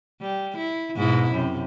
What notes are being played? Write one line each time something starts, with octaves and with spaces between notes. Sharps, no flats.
G3
E4
G#2 B2 E4
F#2 C3